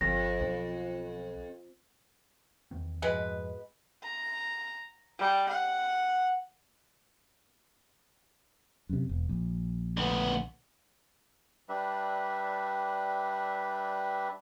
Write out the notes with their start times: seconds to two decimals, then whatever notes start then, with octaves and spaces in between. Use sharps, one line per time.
0.01 G1 F2 A#6
0.41 B1
2.71 E2 D#3 C4
3.02 F2 G#2 B2 F3 G#3 B4
4.03 A#5
5.19 G3
5.49 F#5
8.89 F#2 C3
9.09 E1
9.29 A#1
9.97 D2 B3
11.69 G3 D4 B4 E5